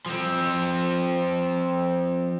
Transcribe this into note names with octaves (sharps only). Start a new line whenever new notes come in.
F3 C4